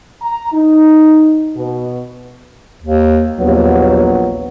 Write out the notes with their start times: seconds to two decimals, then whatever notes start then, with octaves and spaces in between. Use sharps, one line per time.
0.22 A#5
0.52 D#4
1.56 B2
2.83 D#2
3.38 A#1 D#2 F#3 B3